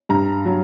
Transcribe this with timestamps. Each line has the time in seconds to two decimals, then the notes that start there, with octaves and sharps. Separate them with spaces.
0.09 G2 A#5
0.45 F#3